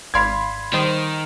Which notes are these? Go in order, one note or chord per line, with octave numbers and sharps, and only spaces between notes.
G#1 D5 F5 B5 C6 G#6
D#3 G3 C5 D#5